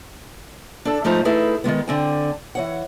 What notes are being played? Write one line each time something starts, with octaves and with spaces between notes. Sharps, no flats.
D4 A4
G#2 F3 A3 D#4 C5 A#5
A3 D#4 E4 G#4 A4 B4
D#3 E3 G#3 B3
D3 C4 G#5
E3 C#5 F#5